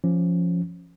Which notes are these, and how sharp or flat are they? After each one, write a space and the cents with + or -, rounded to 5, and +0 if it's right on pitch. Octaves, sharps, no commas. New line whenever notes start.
F3 -5 C#4 +0